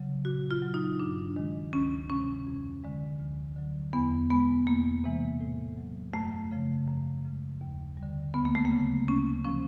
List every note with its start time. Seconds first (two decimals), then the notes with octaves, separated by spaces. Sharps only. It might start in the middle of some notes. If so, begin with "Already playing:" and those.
Already playing: C#3 F#3
0.25 A#2 F#4
0.51 F4
0.62 F#3
0.74 D#4
1.00 G2 D4
1.36 D#3 G#3
1.73 D2 C#4
2.09 C3 F3 G#3 C#4
2.47 F2
2.83 D3 F3 G#3
3.20 D2
3.56 D3 F#3
3.93 E2 B3
4.30 B2 G#3 B3
4.67 E2 A#3
5.04 C3 E3 G#3
5.41 A2
5.78 F#3
6.14 F#2 A3
6.51 C#3 F3
6.88 F#2
7.25 C#3 F3 G#3
7.61 D#2
7.97 G3
8.03 D3
8.34 D2 B3
8.45 A#3
8.55 A3
8.65 A#3
8.71 C#3 F#3
9.08 D2 C#4
9.44 C3 F3 C#4